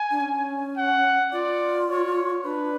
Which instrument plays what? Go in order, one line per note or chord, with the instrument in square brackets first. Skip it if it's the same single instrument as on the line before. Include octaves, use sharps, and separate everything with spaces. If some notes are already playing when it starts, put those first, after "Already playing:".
Already playing: [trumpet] G#5
[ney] D4
C#4
[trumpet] F#5
[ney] F4 [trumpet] D5
[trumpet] C#5
[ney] D4 [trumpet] B4